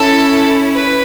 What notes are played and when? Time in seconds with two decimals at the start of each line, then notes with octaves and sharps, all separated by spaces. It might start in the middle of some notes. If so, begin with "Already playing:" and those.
Already playing: C#4 E4 A4
0.72 B4